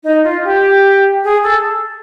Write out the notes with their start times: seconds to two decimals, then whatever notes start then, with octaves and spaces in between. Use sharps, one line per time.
0.03 D#4
0.23 F4
0.43 G4
1.24 G#4
1.43 A4